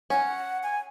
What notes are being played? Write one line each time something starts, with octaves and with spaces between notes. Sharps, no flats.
C#4 F#5
G#5